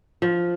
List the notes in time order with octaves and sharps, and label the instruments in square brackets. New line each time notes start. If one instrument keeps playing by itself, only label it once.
[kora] F3